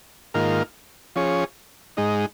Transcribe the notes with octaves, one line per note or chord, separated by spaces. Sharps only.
G#2 D#3 A#3 F4 A#4
F3 C#4 G#4 C#5
G#2 G#3 D#4